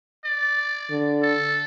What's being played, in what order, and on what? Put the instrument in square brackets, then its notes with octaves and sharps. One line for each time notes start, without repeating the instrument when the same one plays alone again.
[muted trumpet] D5
[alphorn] D3
[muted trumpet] A4